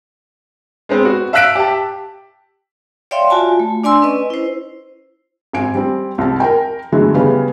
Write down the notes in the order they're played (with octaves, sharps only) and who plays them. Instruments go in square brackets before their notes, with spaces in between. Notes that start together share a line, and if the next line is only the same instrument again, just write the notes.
[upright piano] G#3 B3 C4
F#4
E5 F5 E6 F#6 B6 D7
G4 A5
[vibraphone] C#5 D5 E5 F5 G5 C6
F4 F#4 G#5 A5
A3
D4 D5 G#5 C6 E6
C#4 B4 D#5
E4 C5
[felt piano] G#1 G#5 D7
G3 C4
C2 A5
A#4 G5
D3 E3 F#3 G#3 A3 B3
C#3 G3 B3 C#4